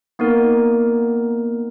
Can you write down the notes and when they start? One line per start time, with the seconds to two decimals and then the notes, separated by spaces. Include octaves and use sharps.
0.19 A#3 B3 D#4 A#4